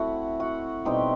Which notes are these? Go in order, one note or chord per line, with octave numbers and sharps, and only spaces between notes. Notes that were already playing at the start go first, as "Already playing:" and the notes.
Already playing: A3 C4 E4 F#4 E5 F#5
F#4 F#5
B2 G3 C4 D#4 G4 G5